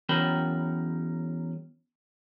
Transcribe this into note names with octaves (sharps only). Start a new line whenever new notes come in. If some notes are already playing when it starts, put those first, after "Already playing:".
E2 F#3 C#4 A#4 G5 B5